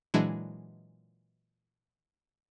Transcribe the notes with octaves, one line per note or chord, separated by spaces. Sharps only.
A#2 E3 F#3 G#3 D4 E4